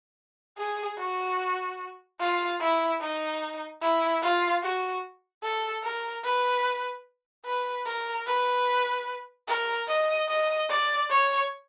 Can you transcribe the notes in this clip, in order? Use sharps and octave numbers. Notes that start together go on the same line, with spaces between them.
G#4
F#4
F4
E4
D#4
E4
F4
F#4
A4
A#4
B4
B4
A#4
B4
A#4
D#5
D#5
D5
C#5